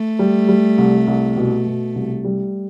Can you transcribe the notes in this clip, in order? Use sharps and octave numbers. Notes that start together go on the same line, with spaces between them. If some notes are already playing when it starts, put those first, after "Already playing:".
Already playing: A3
G3
G3
C2
C2
B2
B2
C2
G3